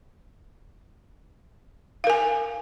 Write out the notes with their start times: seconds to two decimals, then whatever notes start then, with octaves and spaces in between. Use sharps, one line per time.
2.04 F5
2.07 A#4
2.10 G#5